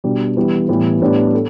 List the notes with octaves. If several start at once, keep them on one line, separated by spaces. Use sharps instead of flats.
B2 G3 B3 D4
E3 G3 B3 E4
A2 E3 G3 B3 E4
A2 G3 B3 D4 G4
A4